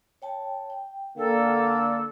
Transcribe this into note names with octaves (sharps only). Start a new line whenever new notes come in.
C#5 G5 A5
G5
D3 A#3 A4